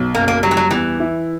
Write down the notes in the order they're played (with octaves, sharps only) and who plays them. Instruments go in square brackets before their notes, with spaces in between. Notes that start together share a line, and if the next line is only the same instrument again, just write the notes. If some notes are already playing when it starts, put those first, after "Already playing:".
Already playing: [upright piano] B1
[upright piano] F#1 [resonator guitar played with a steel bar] A#3
[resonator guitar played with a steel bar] A#3
[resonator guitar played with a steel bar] F#3 [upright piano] G3
[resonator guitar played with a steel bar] E3
F#3
[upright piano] E2 [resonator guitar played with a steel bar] E3
[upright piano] E4